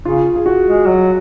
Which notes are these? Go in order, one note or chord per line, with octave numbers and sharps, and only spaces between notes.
C#3 F4
G#4
F#4
G#3
F#3